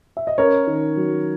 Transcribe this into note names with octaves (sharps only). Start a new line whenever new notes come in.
E5
D#5
C#4 A#4 C#5
D#3
F#3